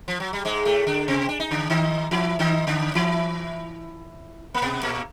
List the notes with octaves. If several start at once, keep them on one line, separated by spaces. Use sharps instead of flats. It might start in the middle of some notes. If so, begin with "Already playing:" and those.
F3
F#3
G3
G#2 G#3
A2 A3
D3 D4
C3 C4
D4
D#4
D3 D4
D#3 D#4
E3 E4
D#3 D#4
D3 D4
E3 E4
A#3
B2 B3
A#2 A#3